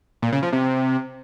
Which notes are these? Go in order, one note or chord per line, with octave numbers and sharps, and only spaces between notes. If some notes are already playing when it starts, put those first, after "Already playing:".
A#2
C#3
F3
C3